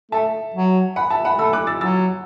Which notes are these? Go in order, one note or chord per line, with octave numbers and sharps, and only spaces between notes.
A3 E5 A5
F#3
F#5 B5
E5 A5
F#5 B5
A3 B5 E6
D6 F#6
E6 A6
F#3 E6 A6